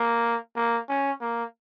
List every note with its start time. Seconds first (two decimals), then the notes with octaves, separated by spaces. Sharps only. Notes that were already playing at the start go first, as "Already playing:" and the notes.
Already playing: A#3
0.56 A#3
0.89 C#4
1.21 A#3